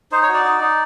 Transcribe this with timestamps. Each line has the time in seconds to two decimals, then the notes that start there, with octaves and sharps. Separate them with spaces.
0.12 D#4 C5
0.23 C#5
0.28 F#4
0.34 D5
0.45 D#4
0.61 D#4